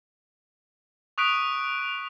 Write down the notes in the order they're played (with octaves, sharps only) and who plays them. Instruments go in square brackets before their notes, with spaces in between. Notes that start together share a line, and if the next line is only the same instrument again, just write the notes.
[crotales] C#6 D#6 F#6 B6 D7 F7